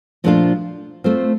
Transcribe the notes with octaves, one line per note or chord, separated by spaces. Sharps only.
A#2 F3 A3 D4 F4
A3 C4 F4 C5